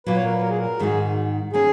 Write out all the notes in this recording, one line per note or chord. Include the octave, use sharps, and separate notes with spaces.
A#2 F#3 A#3 B4
C#5
A#4
B4
A#4
G#4
A#4
G#2 D#3 G#3 D#4 F#4 G#4
D#3 A#3 C#4 G#4